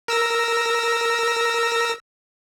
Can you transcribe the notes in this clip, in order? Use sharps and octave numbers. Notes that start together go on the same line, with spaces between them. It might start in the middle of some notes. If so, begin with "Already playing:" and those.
A#4 E6 A#6